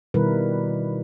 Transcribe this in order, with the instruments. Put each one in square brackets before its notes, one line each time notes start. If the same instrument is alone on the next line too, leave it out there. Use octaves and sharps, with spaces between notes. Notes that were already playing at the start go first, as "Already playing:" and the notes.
[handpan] B2 D#3 G3 E4 A#4 B4